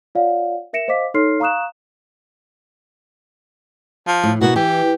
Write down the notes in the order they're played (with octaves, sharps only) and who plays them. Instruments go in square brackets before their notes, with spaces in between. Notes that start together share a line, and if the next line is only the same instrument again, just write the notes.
[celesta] F4 C#5 D5 F5 F#5
A#4 E5 A#6 C#7 D7 E7
C5 D#5 F5 D6 B6
D#4 A4 C#5 C6 F6 C7
F5 A#5 C#6 D#6 F#6 E7
[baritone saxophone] F3
[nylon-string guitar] A2
[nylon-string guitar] B2 A#3 B3 [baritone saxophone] F#4
[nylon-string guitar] E3 [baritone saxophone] G4